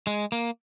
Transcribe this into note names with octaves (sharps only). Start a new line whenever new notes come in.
G#3
A#3